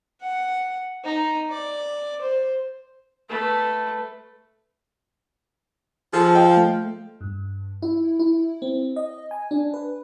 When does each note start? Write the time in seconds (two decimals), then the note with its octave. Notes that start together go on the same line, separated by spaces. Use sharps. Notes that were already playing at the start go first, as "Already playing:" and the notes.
0.21 F#5
1.03 D#4
1.49 D5
2.21 C5
3.29 A3 B4
6.13 F3 G#4 A4
6.35 D#5 F5 G5
6.57 A3
7.21 G2
7.82 E4
8.19 E4
8.62 C4
8.96 D#5
9.31 G#5
9.51 D4
9.74 B4